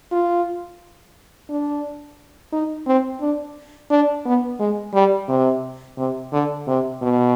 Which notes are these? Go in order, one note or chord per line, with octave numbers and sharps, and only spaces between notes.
F4
D4
D#4
C4
D4
D4
B3
G#3
G3
C3
C3
D3
C3
B2